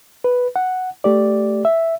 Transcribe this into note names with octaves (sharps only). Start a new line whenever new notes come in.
B4
F#5
A3 G4 D5
E5